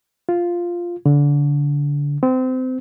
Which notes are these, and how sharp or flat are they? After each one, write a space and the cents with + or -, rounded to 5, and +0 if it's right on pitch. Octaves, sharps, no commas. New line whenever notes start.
F4 +0
D3 -25
C4 -25